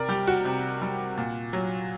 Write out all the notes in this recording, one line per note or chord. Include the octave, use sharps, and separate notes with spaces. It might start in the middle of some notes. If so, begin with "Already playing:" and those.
Already playing: C3 A#4 D5
G3 G4
F#4
C3
G3
A#2
F#3